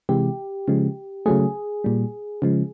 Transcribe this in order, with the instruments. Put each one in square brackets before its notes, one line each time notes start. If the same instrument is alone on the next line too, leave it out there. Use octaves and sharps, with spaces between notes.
[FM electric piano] C3 E3 G#3 G4
C#3 F3 G#3
C#3 F#3 A3 G#4
A#2 G3
C#3 F3 G#3